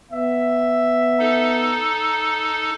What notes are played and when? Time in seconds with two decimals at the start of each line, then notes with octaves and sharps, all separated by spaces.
0.12 B3 E5
1.19 D#4 A4